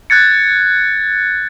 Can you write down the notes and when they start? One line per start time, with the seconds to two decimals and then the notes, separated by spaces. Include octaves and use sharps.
0.10 F#6 G#6 A6 C#7